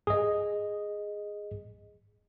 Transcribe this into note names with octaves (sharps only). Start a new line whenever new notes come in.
G#4 D#5